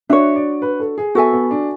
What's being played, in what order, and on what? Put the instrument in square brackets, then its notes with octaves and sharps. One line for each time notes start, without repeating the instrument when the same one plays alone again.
[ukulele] D4 F#4 C#5 [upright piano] E5
[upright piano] D5
B4
A4
G#4
[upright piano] B3 [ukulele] F#4 A4 E5 G#5
[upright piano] B3
D4